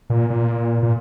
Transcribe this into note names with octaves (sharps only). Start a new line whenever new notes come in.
A#2
A#2
A#2